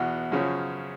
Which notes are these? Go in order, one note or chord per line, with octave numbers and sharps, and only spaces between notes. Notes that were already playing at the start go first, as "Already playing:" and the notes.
Already playing: E2 B2 F#4
F#2 C#3 F3